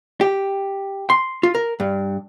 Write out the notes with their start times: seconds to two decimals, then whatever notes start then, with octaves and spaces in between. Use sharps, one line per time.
0.21 G4
1.10 C6
1.43 F4
1.55 A#4
1.80 G2